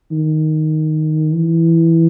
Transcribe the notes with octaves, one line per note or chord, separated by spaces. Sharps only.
D#3
E3